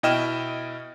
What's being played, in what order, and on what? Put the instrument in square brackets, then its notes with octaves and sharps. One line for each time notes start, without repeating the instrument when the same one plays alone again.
[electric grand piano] B2 E4 D#5 G5 F6 E7